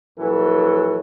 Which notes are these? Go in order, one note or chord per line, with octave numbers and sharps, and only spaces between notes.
A#1 E3 F#3 A4